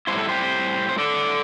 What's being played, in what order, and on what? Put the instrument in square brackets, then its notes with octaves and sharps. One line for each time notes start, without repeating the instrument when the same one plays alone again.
[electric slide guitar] A2 G3 E4 C5
A4
G4 C5
C5
A4 D5